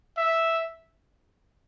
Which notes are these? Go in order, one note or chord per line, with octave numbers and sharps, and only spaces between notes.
E5